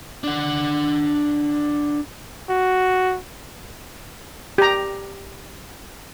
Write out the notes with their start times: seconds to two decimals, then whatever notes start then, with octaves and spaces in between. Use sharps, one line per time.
0.24 D4 F#5
2.49 F#4
4.58 G4 A#5